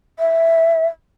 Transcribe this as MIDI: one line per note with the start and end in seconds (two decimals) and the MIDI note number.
0.19 0.86 76